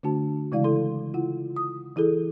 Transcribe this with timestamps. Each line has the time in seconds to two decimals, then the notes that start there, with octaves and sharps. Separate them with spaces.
0.03 D3 A3 D4 F#4 A5
0.52 C#3 E3 G#3 E4 D5 F5
0.64 E4 A4 C6
1.14 E4 F4 F#5
1.56 D#6
1.96 E3 E4 G#4 A4